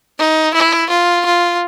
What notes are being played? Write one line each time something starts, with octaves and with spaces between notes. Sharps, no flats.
D#4
E4
F4
F4